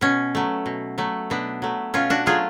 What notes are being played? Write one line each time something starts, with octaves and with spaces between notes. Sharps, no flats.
B2 C#4
F#3 A3
B2
F#3 A3
B2 B3 D4
F#3 A3
B2 C#4 F4
D4 F#4
F#3 A3 F4 G#4